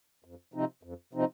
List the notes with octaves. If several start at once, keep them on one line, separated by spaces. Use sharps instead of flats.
F2
C3 F3 C4 D#4
F2
C3 F3 C4 D#4